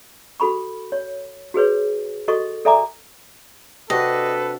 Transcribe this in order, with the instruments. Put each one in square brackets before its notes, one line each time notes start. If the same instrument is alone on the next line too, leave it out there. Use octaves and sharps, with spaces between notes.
[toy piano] F#4 A4 B5 C#6
C#5
F#4 G#4 B4 C#5
F#4 A4 D#5 C#6
A4 D5 E5 G#5 A#5 D6
[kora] C3 D4 F#4 [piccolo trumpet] A4 [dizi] B4 [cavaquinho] D#5